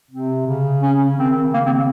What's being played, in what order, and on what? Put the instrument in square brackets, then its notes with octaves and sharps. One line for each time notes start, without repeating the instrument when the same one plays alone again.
[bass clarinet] C3 [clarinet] C4
[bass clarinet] C#3
[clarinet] C#4
[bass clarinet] D#3 [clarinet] C4
[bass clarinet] C#3 [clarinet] A#3
[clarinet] C4